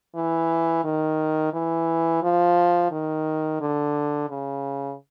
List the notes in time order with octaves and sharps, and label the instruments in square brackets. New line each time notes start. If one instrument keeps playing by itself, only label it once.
[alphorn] E3
D#3
E3
F3
D#3
D3
C#3